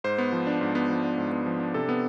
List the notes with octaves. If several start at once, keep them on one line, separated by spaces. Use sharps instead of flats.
G#2 C5
B3
F3
D4
G#2
B3
F3 B4
D4
G#2
B3
F3
D4
C3 A4
B3